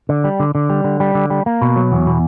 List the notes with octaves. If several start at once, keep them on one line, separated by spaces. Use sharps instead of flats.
D3
G3
D3
D3
G3
D3
G3
D3
G3
A#3
B2
F#3
E2
B2